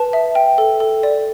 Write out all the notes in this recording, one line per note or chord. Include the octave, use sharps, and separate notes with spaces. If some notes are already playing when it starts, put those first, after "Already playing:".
Already playing: B4 A5
E5
G5
A4
A4
D5